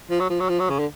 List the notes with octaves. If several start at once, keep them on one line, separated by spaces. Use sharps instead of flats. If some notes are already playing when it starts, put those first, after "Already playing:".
F3
F#3
F3
F#3
F3
F#3
C#3
D3